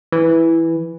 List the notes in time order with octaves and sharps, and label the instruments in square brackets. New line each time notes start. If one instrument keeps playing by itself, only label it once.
[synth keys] E3